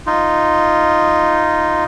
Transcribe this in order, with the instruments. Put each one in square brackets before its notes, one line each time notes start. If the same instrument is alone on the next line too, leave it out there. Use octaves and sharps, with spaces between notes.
[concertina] D#4 F4